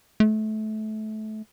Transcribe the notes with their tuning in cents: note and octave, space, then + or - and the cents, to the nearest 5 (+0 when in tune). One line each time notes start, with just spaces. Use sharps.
A3 -25